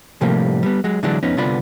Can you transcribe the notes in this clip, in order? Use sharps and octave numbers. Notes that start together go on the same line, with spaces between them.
A2 C3 F3 G3 A3 A#3
G3 B3
F#3 G#3
D3 E3 F#3 G#3 D4
F2 B3 C#4 D#4
C2 D3 B3 F4 D5 B5